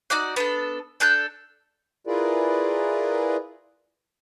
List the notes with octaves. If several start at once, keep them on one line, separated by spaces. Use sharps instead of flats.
D#4 F#4 D5 F#5
B3 D4 A4
D4 A4 F#6 G6
E4 F4 G#4 A#4 B4 D5